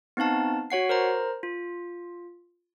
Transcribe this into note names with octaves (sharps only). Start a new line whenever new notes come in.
B3 C4 D#4 F5 A5
F#4 C#5 F#5 C7
A#4 C5 A#5
F4